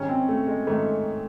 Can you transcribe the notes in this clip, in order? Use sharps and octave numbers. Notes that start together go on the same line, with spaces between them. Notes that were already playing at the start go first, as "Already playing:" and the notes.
Already playing: G#2 D#3 G#3 C#4
C4
A3
G#3
G#2 D#3 G#3 A3